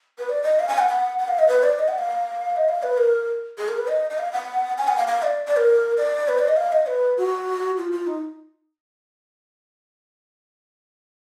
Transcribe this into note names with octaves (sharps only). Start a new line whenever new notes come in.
B4
D5
D#5
F5
G#5
F#5
F#5
F#5
F5
D#5
B4
D5
D#5
F#5
F5
D#5
F5
B4
A#4
G#4
A#4
B4
D#5
D#5
F5
F#5
G#5
F#5
F5
F5
D5
D5
A#4
D5
B4
D5
D#5
F5
D#5
B4
F#4
F4
F4
D#4